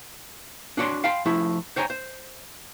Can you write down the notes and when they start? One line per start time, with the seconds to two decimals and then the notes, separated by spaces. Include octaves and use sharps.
0.77 D4 F#4 C#5 D5 C6
1.04 F5 G5 A5 B5 C6
1.25 F3 A3 E4
1.76 C5 C#5 G5 G#5 A#5
1.90 C5